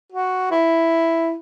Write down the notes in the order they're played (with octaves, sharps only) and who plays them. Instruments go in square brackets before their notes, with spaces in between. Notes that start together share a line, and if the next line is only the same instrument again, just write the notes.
[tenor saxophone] F#4
E4